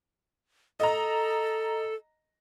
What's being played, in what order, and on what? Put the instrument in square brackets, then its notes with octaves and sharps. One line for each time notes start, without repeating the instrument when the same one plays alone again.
[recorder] A4 [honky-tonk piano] D#5 A#5